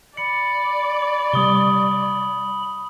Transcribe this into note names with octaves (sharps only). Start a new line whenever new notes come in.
D5 B5 C#7
C3 G3 D#6 G7